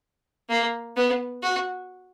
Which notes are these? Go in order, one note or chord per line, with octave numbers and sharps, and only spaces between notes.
A#3
B3
F#4